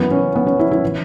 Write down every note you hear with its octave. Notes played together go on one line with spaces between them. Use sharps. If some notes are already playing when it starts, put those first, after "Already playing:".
Already playing: F#2 E3 B3
C#4
B3
C#4
E4
E4
E3